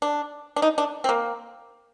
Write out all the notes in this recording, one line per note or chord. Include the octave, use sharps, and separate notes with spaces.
D4
D4
D#4
D4
C4
A#3